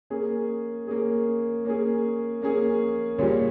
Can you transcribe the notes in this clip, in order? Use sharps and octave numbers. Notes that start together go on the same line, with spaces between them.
A#3 C#4 G#4
A#3 C#4 G#4
A#3 C#4 G#4
A#3 C#4 G#4
A#2 G3 C#4 G#4 C#5